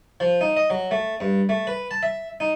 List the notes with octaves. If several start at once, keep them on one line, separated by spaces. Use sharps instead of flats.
F3
D#4
D#5
F#3
A3
G2
A3
B4
A5
E5
D#4